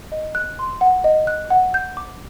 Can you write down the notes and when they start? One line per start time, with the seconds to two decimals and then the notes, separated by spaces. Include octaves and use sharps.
0.12 D#5
0.35 F#6
0.59 C6
0.81 F#5
1.04 D#5
1.27 F#6
1.50 F#5
1.74 G6
1.97 D6